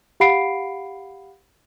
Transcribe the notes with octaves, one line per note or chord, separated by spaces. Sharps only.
G4 F5 F#5 B5 C7 D7